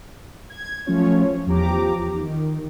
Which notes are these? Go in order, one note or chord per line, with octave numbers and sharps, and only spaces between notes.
G#6
F3 F#3 A3 C#4 F4 C#5
E2 F3 G4 A#5 D6
D#3